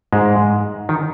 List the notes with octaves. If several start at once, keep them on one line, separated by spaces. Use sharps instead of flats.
G#2 G#3
D#3